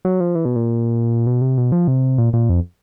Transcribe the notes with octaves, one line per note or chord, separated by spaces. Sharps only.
F#3
F3
E3
B2
A#2
B2
C3
B2
F3
C3
A#2
A#2
F2